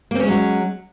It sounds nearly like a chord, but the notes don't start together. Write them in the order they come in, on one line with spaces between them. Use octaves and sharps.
A#3 C4 C#4 G#3 F#3